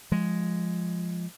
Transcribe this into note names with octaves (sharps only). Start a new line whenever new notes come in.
F3 G#3